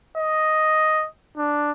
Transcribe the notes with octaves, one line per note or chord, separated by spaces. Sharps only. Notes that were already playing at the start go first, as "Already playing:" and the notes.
D#5
D4